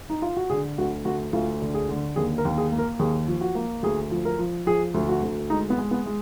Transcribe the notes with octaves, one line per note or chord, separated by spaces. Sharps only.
D#4
F4
F#4
D3 G#4
D2 F#4
D2 F#4
D2 F4
D3
G#4
D3
D#2 G#4
A#4
D#2
G#4
A#3
A#4
D#2 G#4
F3
F#4
A#3
D2 G#4
F3
A#4
F3
F3 G#4
D2
F#4
D2
G#3 D#4
B3
G#3
B3
G#3